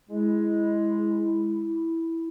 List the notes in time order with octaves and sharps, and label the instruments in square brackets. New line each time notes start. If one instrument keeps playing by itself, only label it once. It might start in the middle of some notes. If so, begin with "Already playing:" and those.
[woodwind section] G#3 [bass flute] E4